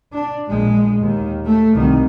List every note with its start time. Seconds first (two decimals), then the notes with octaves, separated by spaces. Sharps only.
0.13 D4
0.48 A#1 G#3
1.00 D#2 D#3
1.45 A3
1.74 C2 D#3